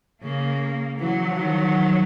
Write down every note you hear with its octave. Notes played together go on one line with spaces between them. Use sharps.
C#3 A#3
E3 F#3
D#3